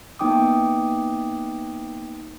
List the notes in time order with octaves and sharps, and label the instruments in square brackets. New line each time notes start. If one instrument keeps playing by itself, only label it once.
[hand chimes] A#3 B3 D#4 G5 D6 D#6